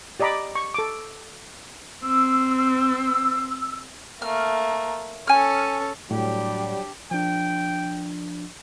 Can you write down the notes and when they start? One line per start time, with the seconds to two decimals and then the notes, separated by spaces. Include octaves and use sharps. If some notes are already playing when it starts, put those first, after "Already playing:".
0.20 G4 D5 D#5 A#5 B5 D6
0.55 C#6
0.74 A4 D6
2.03 C4 E6
4.22 A3 A#3 F6
5.27 C#4 A4 G#5 F6
6.11 A2 F#3 G3 D4 G4
7.11 F3 D4 G5